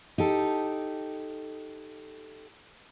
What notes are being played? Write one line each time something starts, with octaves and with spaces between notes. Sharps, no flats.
D#4 G4 A4